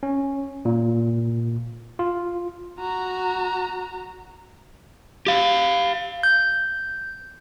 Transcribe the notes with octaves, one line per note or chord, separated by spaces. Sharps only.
C#4
A#2
F4
F#4 A#5
G4 F5
G6